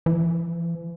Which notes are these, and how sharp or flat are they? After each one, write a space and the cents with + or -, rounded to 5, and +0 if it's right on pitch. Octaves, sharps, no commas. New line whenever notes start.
E3 +40